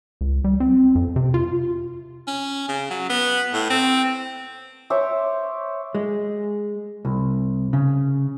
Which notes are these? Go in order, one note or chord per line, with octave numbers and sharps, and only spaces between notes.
C#2
G3
C4
F2
C3
F4
C#4
C#3
F#3
B3
A2
C4
C5 C#5 E5 D6
G#3
C2
C#3